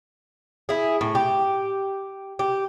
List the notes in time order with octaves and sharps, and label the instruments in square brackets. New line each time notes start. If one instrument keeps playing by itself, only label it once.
[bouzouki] E4 G#4
A2
G4
G4